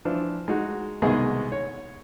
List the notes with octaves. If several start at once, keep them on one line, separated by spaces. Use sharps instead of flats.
E3 F3 D4
G#3 D#4 F#4
C2 B2 D#3 G#3 G#4 D#5
C#5